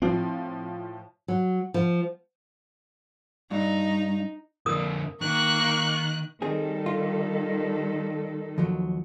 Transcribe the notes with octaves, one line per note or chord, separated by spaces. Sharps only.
A2 F3 C4
F#3
F3
G2 D#4
F2 D3 A#4 D#6
D#3 A#3 C#6 F#6
D#3 G3 C4 G#4 A4
F4
D#2 F3 F#3